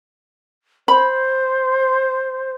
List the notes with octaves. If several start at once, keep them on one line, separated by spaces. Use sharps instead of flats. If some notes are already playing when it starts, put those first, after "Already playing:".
C5 B5